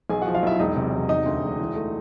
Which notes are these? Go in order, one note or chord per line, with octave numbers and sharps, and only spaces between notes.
B1 G#4 G#5
F3 F#4 F#5
F4 F5
B1 E4 E5
E1 D#4 D#5
C3
E1
E1 D#4 D#5
D2
E1
E3
A3